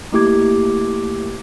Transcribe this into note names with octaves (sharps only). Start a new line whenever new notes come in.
A3 A#3 E4 G4 D6 G#6